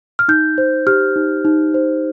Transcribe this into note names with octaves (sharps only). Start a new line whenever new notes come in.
F6
D#4 G6
C5
G4 F6
D#4
D#4
C5